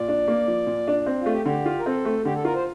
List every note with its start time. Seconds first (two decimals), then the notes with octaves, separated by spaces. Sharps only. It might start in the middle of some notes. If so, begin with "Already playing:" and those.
Already playing: A#2 D5
0.08 D4
0.28 A#3
0.48 F3
0.67 A#2
0.88 D4
1.06 C4
1.20 F4
1.26 A3
1.33 G4
1.46 D3 G4
1.66 F4
1.79 A#4
1.86 C4 A4
2.05 A3
2.25 D3 G4
2.34 A4
2.44 F4 A#4
2.55 C5